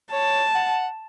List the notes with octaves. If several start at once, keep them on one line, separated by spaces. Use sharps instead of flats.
C#5 A5
F#5